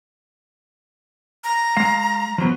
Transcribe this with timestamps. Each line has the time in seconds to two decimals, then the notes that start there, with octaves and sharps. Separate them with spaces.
1.44 A#5
1.77 G#3 F5
2.38 F3 F#3 B3